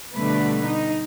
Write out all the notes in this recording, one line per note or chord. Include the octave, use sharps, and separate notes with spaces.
B2 D3 G3 A3 B4
D#4